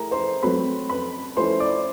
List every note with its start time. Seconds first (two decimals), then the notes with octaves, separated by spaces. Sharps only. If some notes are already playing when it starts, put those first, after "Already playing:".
Already playing: A3 E4 G#4 A#4 A#5
0.11 C5 C6
0.43 F#3 A3 C4 B4 B5
0.90 B4 B5
1.37 F3 A3 C#4 E4 C5 C6
1.60 D5 D6